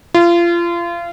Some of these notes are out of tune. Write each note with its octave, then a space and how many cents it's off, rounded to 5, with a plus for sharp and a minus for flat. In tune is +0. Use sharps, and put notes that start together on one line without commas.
F4 -30